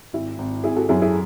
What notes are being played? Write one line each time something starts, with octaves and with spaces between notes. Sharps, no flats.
G#1 E4
G#1
G#1 E4 G#4
F#4 A4
F#2 E4 G#4
E4 G#4